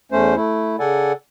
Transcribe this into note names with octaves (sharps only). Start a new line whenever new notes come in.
E2 A3 C#4 C5
A3 E4
C#3 A4 D5 F#5 G#5